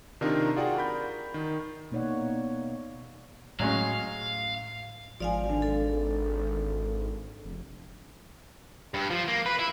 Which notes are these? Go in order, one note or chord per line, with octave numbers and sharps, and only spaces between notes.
C3 D#3 D4 D#4 F4 A#4
F4 F#4 G#4 D5 F#5 G5
A#4 B5 G6
D#3
B2 A#3 D#4 C#5 D5 F#5
A2 F#3 G#3 C#4 F5
G#1 F3 D5 F5 G#5
D3
A4
F1
G2
F3
A#3
B4
E4